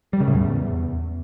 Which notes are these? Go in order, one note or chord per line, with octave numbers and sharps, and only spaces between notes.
G3
C#3
A2
E2